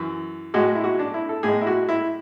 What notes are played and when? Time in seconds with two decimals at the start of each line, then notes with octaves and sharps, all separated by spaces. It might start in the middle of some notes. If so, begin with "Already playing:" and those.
Already playing: F#2 E3
0.54 A2 G#3 F#4
0.75 E4
0.84 F#4
0.99 D4
1.14 E4
1.29 A4
1.43 A2 G#3 G#4
1.61 E4
1.67 F#4
1.89 E4